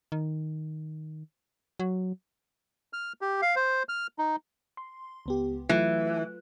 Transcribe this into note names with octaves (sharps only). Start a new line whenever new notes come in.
D#3
F#3
F6
G4
F5
C5
F6
D#4
C6
C#2 B3 G4
E3 F#3 A3 F4